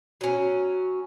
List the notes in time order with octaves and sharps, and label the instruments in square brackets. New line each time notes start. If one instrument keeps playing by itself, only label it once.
[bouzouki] F#3 C#4